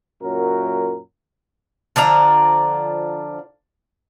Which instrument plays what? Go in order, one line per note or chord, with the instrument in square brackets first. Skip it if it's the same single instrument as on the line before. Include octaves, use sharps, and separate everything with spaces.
[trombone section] F#2 A#2 F#3 A#4
[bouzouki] D3 F3 D4 A#5